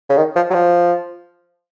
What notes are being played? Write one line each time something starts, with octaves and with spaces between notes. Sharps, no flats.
C#3
D#3
F3
F#3
F3